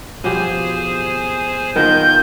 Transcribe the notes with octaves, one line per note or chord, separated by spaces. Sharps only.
B2 F3 G4 G#4 C5 G#5
D#3 B3 F4 A#4 G6